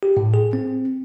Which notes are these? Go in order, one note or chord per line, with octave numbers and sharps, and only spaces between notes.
G4
A2
G#4
C4